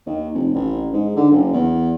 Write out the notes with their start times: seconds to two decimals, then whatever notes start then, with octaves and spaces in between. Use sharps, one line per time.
0.06 D#2
0.34 F1
0.54 A1
0.93 G#2
1.16 D3
1.31 F#1
1.53 E2